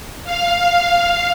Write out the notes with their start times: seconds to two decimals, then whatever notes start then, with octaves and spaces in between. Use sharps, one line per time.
0.24 F5